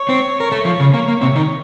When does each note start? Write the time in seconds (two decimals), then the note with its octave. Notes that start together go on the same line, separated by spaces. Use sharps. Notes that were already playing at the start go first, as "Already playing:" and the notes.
Already playing: C#5
0.09 C4 C5
0.40 A#4
0.52 A3 A4
0.65 F3 F4
0.80 C#3 C#4
0.94 A#3 C#5
1.08 A#3
1.21 C3 C4 C#5
1.35 D#3 D#4